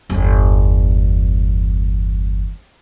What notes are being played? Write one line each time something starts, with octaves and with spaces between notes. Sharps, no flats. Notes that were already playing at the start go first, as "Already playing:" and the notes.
G1 E2